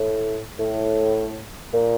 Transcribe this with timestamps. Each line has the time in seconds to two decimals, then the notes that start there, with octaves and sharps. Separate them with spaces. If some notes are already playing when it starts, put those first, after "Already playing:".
Already playing: A2
0.58 A2
1.73 A#2